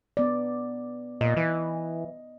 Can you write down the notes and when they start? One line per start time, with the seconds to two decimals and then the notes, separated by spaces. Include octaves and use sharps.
0.17 B3 D5
1.21 A#2 D#5
1.37 E3